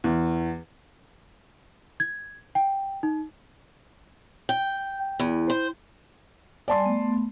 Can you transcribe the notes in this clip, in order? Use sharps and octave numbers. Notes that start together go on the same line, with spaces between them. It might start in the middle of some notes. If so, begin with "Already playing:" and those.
E2
G#6
G5
D#4
G5
E2
C5
G3 D5 G#5 A5 C6
A3 B3